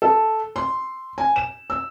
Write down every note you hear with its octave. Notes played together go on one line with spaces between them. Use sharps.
A4
C6
G#5
E7
E6